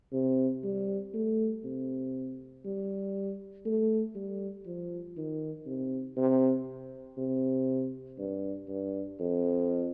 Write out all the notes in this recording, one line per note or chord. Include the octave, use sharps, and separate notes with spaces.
C3
G3
A3
C3
G3
A3
G3
F3
D#3
C3
C3
C3
G2
G2
F2